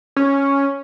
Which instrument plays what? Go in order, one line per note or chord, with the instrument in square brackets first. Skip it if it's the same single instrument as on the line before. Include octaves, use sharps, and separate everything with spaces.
[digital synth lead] C#4